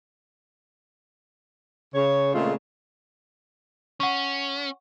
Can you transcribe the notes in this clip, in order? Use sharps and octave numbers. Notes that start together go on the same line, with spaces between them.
C#3 C#5
A#2 C#3 G#3 A3 C4 F4
C#4 F#5 C#6